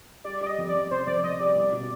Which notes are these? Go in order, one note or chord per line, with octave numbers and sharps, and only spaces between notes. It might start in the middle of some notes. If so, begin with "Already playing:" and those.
G3 D5
G3 D5
D#5
F2
D5
F2
C3 C5
F2 D5
F2 D#5
G3 D5
C2
B2